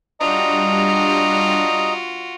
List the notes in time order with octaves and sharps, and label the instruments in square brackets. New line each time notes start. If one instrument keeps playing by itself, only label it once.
[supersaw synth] G3 D4 [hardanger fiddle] F4 F#4 [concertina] D#5 A#5